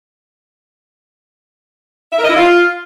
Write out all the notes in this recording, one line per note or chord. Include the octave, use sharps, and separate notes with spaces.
E5
A#4
D#5
E4
F4